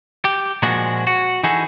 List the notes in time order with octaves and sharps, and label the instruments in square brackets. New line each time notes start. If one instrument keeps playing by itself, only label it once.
[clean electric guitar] G4
A#2 F3 G#3 D4 F#4
F#4
E3 D#4 F#4 G#4 A4